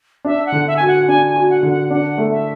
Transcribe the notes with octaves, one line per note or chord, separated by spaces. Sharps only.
D4 E5
F#5
D3
E5
F#4 G#5
F#5
D4 G#5
G#5
F#4
F#5
D3
F#5
D4 F#5
A3
E5